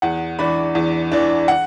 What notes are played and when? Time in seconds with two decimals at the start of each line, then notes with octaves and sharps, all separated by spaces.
0.02 E2 F#5
0.39 E3 D4 B5
0.75 E2
1.12 E3 D4
1.48 F#5